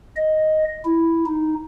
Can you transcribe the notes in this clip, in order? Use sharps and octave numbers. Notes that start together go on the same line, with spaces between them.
D#5
E4
D#4